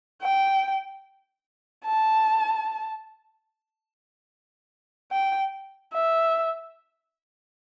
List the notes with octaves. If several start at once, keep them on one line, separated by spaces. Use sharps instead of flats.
G5
A5
G5
E5